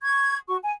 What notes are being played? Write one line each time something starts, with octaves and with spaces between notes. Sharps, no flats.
C#6 G#6
F#4 C#6
G#5